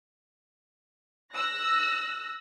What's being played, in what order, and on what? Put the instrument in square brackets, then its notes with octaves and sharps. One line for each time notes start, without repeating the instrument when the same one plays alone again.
[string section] E6 F#6 A#6